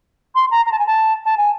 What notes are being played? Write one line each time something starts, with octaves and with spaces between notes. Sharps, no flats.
C6
A#5
A#5
A5
G#5
A5
A5
G#5